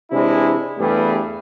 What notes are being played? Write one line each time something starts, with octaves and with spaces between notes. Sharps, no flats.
C3 E3 G#3 D4 E4
E2 G2 G3 A3 B3 G#4